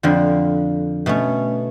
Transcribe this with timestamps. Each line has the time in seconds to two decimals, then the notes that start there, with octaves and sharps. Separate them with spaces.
0.03 F2 D3 F3
1.06 B2 A3 C#4